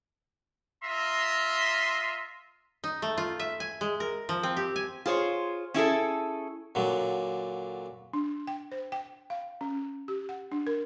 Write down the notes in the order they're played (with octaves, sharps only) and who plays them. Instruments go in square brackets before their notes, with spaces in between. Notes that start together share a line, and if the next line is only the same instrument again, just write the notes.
[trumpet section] F4 D#5 E5 A#5 C6
[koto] D#4
A3
F4
E5
G#5
G#3
A#4
F3
C4
G4
G#5
[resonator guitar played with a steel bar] F4 G#4 C5 C#5
C#4 E4 G#4 A4
[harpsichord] A#2 D3 F#3
[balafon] D4
G5
C5
G5
F5
C#4
G4
F#5
D4
A#4